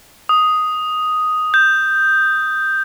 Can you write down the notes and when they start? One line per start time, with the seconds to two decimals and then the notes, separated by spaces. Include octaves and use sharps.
0.29 D#6
1.54 G6